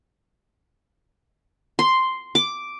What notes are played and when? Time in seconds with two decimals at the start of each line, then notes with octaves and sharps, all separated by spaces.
1.79 C6
2.35 D6